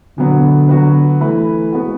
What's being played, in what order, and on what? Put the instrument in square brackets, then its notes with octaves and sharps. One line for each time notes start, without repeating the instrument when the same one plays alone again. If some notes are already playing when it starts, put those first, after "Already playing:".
[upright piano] B2 F#3 B3 [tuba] D3
[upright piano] F#3 B3 F#4 B4
E3 A3 E4 B4
G#3 B3 F#4